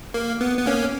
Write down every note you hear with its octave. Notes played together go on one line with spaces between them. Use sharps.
A#3
B3
B3
A#3 C#4